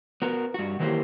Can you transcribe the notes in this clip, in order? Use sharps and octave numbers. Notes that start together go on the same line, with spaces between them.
B3 F#4 A#4
G2 F#4
D#3 E3 F#3 A#3 G4 C5